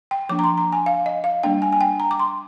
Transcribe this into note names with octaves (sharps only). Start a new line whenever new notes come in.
G5
F3 A#3 D4 D6
A#5
C6
A#5
G#5
F5
D#5
F5
G3 A#3 D4 G5
G#5
G#5
G5
A#5
D6
C6